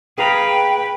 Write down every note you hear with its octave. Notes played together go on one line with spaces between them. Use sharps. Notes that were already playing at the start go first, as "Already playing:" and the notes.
G#4 B4 F5 G5 A#5